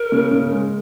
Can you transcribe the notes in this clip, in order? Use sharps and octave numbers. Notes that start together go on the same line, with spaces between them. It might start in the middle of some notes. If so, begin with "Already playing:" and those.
Already playing: A#4
C#3
C#3
G#3